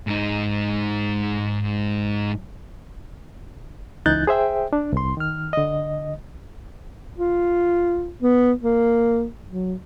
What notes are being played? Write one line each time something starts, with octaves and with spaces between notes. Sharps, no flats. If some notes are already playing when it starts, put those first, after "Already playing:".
G#2 D#4
C#2 E3 D#4 F#6 G6 A6
G#4 C5 E5 G5
D4
C2 C6
D#3 F6
D3 D#5
F4
B3
A#3
F#3